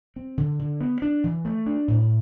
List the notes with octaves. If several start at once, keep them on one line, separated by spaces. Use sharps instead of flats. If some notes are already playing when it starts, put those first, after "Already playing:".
C4
D3
D3
B3
D4
E3
A3
D4
A2